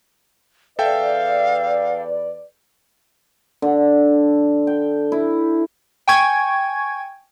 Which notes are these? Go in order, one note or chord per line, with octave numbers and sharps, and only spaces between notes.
E2 A4 B4 D5 E5 F5 G5
D3
G5
E4
G5 G#5 C#6 G#6